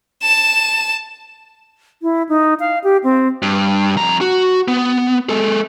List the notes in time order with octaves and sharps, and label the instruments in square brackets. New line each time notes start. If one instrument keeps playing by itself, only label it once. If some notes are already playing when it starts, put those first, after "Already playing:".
[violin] A5 E7
[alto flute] E4
D#4
F5
G4
C4
[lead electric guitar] G2
F2 A#5
F#4
B3
G#3 A4